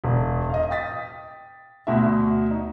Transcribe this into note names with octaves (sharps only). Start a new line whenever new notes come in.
E1
D#5 F5
G5 D#6 A6 B6
D2 B2 F#4 E5
D#4